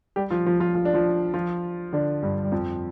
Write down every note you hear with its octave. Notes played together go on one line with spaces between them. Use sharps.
G3 G4
F3 F4
F3 F4
F3 F4
F4
D4
F3 F4
F3 F4
D3 D4
G2 G3
G3
F2 F3